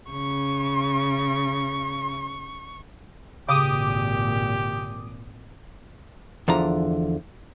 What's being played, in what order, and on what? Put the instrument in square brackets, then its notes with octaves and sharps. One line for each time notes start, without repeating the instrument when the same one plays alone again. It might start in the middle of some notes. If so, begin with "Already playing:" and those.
[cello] C#3 [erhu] C#6
[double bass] G#1 A#2 [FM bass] C#3 [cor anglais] G4 [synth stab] D6 D#6
[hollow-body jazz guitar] E2 D3 F3 A#5